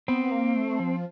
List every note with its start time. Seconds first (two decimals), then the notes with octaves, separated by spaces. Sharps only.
0.08 B3 C4
0.31 A#3
0.56 A3
0.80 F3